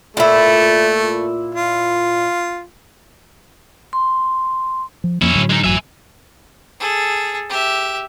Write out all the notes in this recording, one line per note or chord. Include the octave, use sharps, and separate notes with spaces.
A#2 A3 E4
F4
C6
F3
F2 F3 A#3 C#4 E4
A2 D3 F#3
G#3 D#4
A1 F#2 F#3 E5 G#5
G#4 A4
G4 E5